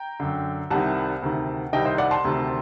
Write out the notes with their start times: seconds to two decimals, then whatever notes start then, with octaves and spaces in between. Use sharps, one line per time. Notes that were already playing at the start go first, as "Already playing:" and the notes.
Already playing: G5 A#5
0.20 F#2 D3
0.70 C2 C3 D#3 F#5 A5
1.22 D2 C3 D#3
1.73 C2 C3 D#3 D#5 G5
1.85 C5 D#5
1.98 D5 F#5
2.11 A5 C6
2.24 D2 C3 D#3